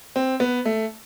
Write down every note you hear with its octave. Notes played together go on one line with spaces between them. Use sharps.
C4
B3
A3